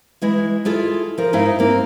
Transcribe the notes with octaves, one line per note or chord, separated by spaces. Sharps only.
E3 G#3 E4
E4 F4 G#4 A4
F3 A#4
G#2 D#4 E4 F5
A#3 C4